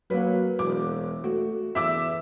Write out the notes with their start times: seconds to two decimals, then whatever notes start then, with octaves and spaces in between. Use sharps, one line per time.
0.10 F#3 A#3 B4
0.59 E1 D6
1.24 A3 F#4
1.75 E2 E5 D6 E6